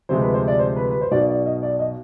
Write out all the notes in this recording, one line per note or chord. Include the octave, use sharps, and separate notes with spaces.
D2 C3 F3 G#3 C5
B4
C5
D5
C5
B4
B4
C5
B1 B2 B3 D5
D5
D#5
D5
D#5